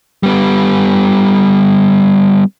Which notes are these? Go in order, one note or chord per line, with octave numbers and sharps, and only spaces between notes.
G3 B3